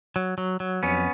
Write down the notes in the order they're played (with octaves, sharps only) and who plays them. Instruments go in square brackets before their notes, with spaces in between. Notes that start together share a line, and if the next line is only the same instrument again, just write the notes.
[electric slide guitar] F#3
F#3
F#3
F2 B3 C#4